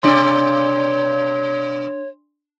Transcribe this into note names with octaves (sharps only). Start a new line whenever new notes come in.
G2 B2 D4 C#5 D5 C6